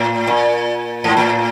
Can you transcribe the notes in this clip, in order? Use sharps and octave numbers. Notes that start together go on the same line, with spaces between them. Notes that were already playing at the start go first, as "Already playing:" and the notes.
Already playing: A2
A#2
G#2
A2